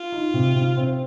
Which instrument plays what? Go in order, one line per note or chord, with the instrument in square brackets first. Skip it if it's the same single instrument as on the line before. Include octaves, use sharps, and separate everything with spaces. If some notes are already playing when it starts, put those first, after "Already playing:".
Already playing: [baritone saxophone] F4
[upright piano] D#4
C3
C3
C4